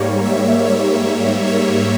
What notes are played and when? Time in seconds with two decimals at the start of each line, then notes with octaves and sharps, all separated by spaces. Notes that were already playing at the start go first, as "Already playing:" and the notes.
Already playing: G#2 G3 A#3 C#5
0.25 E5
0.67 C#5
1.48 C#5